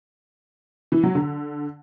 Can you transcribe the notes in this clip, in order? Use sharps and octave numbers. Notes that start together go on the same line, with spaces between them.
E3
F#3
D3